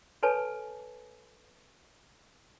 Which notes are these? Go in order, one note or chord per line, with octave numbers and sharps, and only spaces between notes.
A4 B4 C#5 G#5 A5